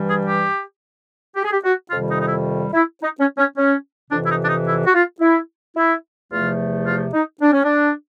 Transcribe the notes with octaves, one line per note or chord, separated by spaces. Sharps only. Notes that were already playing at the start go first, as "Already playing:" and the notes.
Already playing: G2 E3 G3
G#4
G4
G4
G#4
G4
F#4
F2 C3 D#3 G3 F4
D#4
D#4
E4
E4
D#4
C#4
C#4
C#4
F2 C3 E3 D4
E4
D#4
D4
D#4
E4
F#4
F4
E4
E4
E2 C3 F3 A3 F4
F4
D#4
D4
C#4
D4